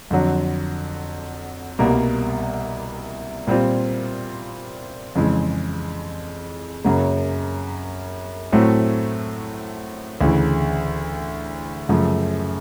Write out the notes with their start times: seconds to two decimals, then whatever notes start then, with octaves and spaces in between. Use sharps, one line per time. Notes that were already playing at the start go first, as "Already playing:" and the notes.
0.11 F2 D3 F#3
1.79 C2 B2 G3 A#3
3.47 A#2 G3 C4 F4
5.15 F2 C#3 E3 G#3
6.84 F#2 C#3 F#3 A#3 C#4
8.52 A2 F#3 A3 C4
10.21 D2 C#3 E3
11.89 F#2 C#3 F3 A3